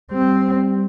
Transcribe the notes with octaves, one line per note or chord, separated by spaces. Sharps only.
G3 C4